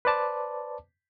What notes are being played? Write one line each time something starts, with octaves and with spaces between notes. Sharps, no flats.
B4 C5 D5 A5 D6